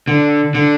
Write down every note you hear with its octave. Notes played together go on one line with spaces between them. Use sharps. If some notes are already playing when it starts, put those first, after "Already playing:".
D3
D3